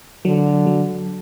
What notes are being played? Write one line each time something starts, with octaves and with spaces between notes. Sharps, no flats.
D3 F#3
F#3